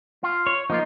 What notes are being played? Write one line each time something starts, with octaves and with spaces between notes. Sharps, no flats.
F4
C#5
F3 A#3 D#4 F4